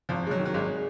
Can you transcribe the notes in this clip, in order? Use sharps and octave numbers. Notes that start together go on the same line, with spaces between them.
G#1 F3
G#1 G#3
F#3
D#3
F#3
G#1 G#3